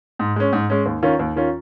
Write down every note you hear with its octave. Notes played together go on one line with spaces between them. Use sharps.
G#2
G#3 C#4
G#2
G#3 C#4
D#2
D#3 C#4 F4
D#2
D#3 C#4 F4